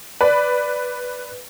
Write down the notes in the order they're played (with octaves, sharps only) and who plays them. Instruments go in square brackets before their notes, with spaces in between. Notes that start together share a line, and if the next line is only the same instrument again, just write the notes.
[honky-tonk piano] B4 D5